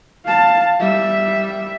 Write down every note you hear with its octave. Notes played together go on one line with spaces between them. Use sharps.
F5 A5
G3 E5